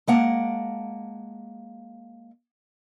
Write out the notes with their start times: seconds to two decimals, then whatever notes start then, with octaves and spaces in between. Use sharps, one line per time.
0.07 G#3 A#3 F#5 A5